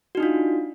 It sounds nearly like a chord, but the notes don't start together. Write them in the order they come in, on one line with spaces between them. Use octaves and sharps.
F#4 D#4 D4 F4